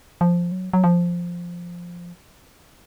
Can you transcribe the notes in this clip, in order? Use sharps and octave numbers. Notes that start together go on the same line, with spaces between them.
F3
F#3
F#3
F3